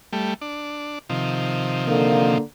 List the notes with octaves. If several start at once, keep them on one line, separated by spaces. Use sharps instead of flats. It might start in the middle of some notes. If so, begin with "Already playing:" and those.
G3 A3
D4
C3 D#3 F3
D3 A#3